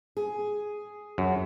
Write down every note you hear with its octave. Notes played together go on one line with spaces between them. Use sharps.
G#4
F#2